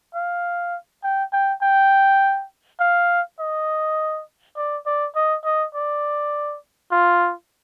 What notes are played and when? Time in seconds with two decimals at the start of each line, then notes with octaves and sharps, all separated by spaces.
0.15 F5
1.03 G5
1.33 G5
1.62 G5
2.80 F5
3.40 D#5
4.57 D5
4.86 D5
5.16 D#5
5.45 D#5
5.75 D5
6.92 F4